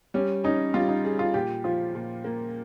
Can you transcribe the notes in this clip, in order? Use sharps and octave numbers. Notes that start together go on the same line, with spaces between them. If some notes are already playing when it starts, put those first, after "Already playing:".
G3 C#4
C#4 D#4
G3 F4
D#4
G#4
F4
A#2 G4
F3 F4
A#2
A#3